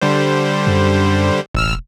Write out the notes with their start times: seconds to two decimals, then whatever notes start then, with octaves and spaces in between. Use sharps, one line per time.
0.01 D3 G3 C5
0.67 F#2
1.54 E1 A1 E6 F6